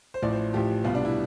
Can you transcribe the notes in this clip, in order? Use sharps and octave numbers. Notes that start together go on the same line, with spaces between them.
C5
A1 A2 F3 D5
C5
A1 A2 F3 G4
C2 B2 G3 B3 F4
D4
E4